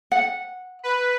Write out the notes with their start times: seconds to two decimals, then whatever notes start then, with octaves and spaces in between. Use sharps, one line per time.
0.12 F#5
0.83 B4